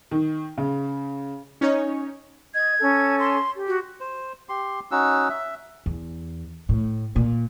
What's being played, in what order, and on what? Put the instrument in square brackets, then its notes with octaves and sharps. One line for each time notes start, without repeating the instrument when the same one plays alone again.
[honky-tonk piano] D#3
C#3
[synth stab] C#4 D#4 C#5
[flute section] D#5 [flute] G#6
[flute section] C#4 A4
[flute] C6
[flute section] G4
[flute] F#4
[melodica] C5
G4 C6
C#4 D#4 F#4 E6
E5
[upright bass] E2
A2
A#2